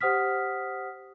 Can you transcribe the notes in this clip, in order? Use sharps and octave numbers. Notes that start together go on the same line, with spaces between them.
G4 C5 F#5 D#6 F6 B6